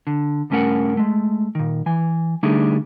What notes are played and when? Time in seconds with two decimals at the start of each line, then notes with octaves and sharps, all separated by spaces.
0.07 D3
0.50 C#2 G2 A3 C#4 A#4 F#5
0.97 G#3 A3
1.55 A#2 D#3
1.86 E3 G#5
2.43 D3 G3 A3 D4 D#4 G#4